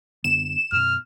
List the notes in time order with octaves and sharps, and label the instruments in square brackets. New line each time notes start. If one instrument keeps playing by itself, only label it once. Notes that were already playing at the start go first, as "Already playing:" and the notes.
[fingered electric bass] F#2 D3 B3 [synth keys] E7
[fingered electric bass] F#2 B2 [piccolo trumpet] F6